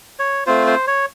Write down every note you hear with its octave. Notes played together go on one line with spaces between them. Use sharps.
C#5
A3 C4 F4 C5
C5
C#5